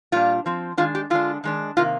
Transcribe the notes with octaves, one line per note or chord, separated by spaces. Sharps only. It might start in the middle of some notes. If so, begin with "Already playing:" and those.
A#2 G3 D4 F4
F3 C4
D#3 G#3 D4 F4
G4
D3 G#3 D4 F4
D#3 G#3 D4
C3 D#3 A#3 F4